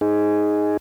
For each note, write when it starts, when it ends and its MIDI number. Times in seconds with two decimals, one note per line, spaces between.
0.01 0.77 63
0.01 0.77 68